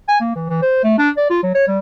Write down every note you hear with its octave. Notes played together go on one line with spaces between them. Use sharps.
G#5
A#3
E3
E3
C5
A3
D4
D5
F4
F#3
C#5
G3